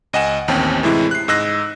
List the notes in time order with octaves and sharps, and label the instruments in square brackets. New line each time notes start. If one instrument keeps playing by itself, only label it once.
[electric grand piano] C#2 D#5 F#5 G#5 E7
A1 D#2 C4 C#4 G5 A5
A2 C3 E3 G#3 E4
F#6 C7
G#2 D#5 E6 F#6 A#6